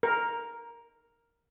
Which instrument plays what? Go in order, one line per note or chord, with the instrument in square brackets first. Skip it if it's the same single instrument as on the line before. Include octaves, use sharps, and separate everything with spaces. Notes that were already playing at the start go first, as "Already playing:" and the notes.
[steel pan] A#4